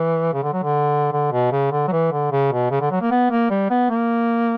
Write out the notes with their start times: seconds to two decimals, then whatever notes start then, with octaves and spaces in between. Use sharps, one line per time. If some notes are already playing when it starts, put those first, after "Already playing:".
Already playing: E3
0.33 C#3
0.43 D3
0.53 F#3
0.63 D3
1.12 D3
1.32 B2
1.52 C#3
1.72 D3
1.88 F#3
1.92 E3
2.12 D3
2.32 C#3
2.52 B2
2.71 C#3
2.81 D3
2.91 F#3
3.01 A#3
3.11 B3
3.31 A#3
3.50 G3
3.70 B3
3.90 A#3